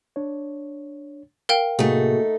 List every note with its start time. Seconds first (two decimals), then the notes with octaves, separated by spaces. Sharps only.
0.16 D4 C#5
1.49 A#4 F5 G5
1.79 A2 C3 A3 A#3 D#4 F#4 G#4